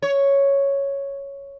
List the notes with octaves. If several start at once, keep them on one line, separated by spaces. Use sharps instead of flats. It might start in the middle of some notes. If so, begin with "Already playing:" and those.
C#5